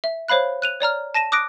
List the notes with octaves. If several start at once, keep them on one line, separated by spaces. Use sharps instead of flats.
E5
C5 C#5 F5 B5 F#6
F#6 D#7 F7
C#5 D5 A#5 F6
A5 A#6 D#7 E7
D6 D#6 F#6 A#6 D7